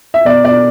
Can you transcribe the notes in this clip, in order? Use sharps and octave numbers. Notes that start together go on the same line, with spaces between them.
E5
B2 D5
B2 D5